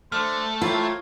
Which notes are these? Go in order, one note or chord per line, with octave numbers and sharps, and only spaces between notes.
A3 D4 C5 F6
A#3 C4 E4 F4 C#5